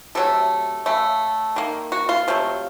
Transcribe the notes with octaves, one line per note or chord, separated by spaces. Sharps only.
C3 F#3 A3 A4
C#3 A3
D#3 A#3
F#4
F4
C3 F#3 A3